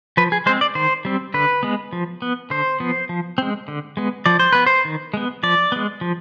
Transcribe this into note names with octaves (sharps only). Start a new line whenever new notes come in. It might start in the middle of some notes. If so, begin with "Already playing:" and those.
F3 B4
G#4
G#3 C4 C5
D5
D#3 C5
G3 C4
D3 B4
G#3 B3
F3
B3
D3 C5
F3 B3
F3
G#3 C4
D3
G#3 B3
F3 D5
C5
B3 B4
C5
D#3
G#3 B3
F3 D5
G#3 B3
F3